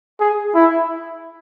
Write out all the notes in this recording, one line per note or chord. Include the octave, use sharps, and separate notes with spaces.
G#4
E4